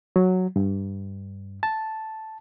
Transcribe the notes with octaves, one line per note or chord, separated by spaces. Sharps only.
F#3
G2
A5